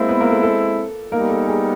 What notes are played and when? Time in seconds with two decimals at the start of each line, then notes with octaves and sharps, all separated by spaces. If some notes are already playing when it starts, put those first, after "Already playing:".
Already playing: G#3 A#3 C4 E4 A#4
0.09 B3 B4
0.20 A#3 A#4
0.31 A4
0.43 A4
1.12 G3 A#3 B3 D#4 A#4
1.30 A4
1.48 G#4